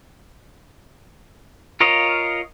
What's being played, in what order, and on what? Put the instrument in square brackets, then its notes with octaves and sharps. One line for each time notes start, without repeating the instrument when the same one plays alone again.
[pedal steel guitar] F4 A#4 C#5 D#5 F5